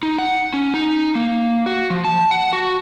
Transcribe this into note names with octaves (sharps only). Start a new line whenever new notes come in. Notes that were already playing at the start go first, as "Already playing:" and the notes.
D#4
F#5
C#4
D#4
A#3
F#4
F3
A5
F#5
F#4